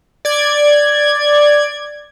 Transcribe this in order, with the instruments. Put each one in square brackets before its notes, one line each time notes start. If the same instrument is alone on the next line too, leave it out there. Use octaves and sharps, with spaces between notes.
[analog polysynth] D5 G#6